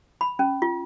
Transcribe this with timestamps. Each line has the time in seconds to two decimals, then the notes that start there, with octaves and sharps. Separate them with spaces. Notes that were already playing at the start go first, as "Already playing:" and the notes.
0.21 B5
0.39 C#4
0.62 F4